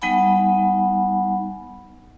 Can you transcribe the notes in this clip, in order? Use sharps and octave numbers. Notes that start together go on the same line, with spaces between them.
G3 B3 D#4 F#5 G#5 B5